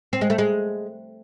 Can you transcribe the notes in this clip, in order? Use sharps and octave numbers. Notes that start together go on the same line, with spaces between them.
C4
G#3
A3
G#3